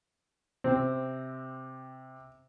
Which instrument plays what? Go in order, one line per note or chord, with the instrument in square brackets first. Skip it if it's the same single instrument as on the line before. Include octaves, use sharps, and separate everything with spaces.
[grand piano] C3 [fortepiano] C4